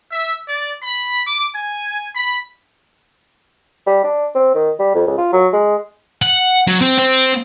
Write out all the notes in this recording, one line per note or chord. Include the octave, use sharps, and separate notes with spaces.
E5
D5
B5
D6
G#5
B5
G3
D4
C4
D#3
G3
F2
C#2
F4
F#3
G#3
F#5
F#3
C4
C4